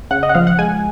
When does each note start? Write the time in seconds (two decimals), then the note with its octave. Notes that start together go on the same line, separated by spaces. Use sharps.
0.11 C#3 F#5
0.23 D#5
0.29 F#5
0.35 F3 F5
0.47 F#5
0.59 G#3 G#5